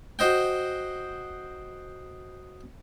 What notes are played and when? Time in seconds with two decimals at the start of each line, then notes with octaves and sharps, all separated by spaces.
0.19 F#4 C5 D#5 G5